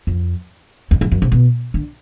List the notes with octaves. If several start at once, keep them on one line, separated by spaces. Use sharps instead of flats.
F2
E2
F2
F#2
C3
B2
D3